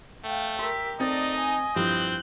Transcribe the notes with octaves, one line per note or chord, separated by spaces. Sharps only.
A3 F5 G5
G4 A#4 E5 C6
A3 C4 D#4 D5 D#5 A6
G#5
G2 F3 C4 E4 F#6 G6